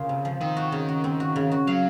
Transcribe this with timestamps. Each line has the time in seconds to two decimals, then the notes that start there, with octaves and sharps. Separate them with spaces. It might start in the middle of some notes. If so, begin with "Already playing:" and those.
Already playing: C#3 A#3 F4
0.09 C3
0.25 F3
0.41 D#3 C4
0.57 F#4
0.72 C#3
0.88 F#4
1.04 C4
1.20 F#4
1.36 C#3
1.51 F#4
1.67 F#3 F5